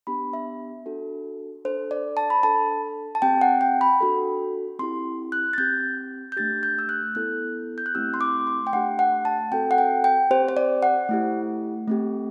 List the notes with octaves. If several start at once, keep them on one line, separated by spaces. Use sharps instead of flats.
B3 D4 G4 B5
E5
D4 F#4 A4
D4 A4 C5
D5
A5
B5
D4 A4 A5
A5
C4 G4 G5
F#5
G5
B5
D4 F#4 A4
C4 E4 G4 C6
F#6
A6
C4 G4 G6
G6
A3 D4 G4 A6
G6
E6
F#6
B3 E4 A4 F#6
G6
F#6
A3 C4 E4 G4 E6
C6
D6
C6
G5
A3 D4 G4 F#5
F#5
A5
C4 F#4 A4 G5
F#5
G5
G5
C4 G4 C5
C5
D5
F#5
A3 E4 G4
A3 C4 G4